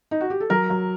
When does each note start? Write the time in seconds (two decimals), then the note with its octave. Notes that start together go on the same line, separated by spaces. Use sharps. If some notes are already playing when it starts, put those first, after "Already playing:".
0.11 D#4
0.21 F#4
0.30 G4
0.40 A4
0.50 F#3 A#4
0.70 F#3